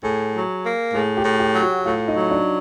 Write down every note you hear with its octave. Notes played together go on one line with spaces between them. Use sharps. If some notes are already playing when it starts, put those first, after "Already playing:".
A2 G#4 G#5
F#3
A#3
A2 G#4 G#5
G4 G5
A2
G4 G5
F#3
F#4 F#5
A2 F4 F5
D#4 D#5
F#3
D4 D5